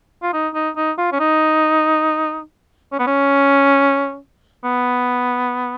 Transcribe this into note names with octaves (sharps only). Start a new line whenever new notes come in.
F4
D#4
D#4
D#4
F4
C#4
D#4
C#4
B3
C#4
B3